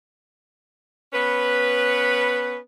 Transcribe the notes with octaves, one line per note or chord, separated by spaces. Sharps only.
B3 C#4 B4